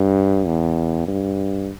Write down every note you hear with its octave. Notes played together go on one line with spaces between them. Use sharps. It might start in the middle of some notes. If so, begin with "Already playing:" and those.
Already playing: G2
E2
G2